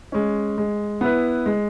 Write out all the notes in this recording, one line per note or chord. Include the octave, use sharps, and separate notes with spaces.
G#3 C#4
G#3
B3 E4 B4
G#3